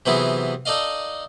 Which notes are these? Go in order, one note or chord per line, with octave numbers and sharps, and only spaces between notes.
C3 E3 F#3 B3 E4 G#4
D#4 A4 D5 D#5 F5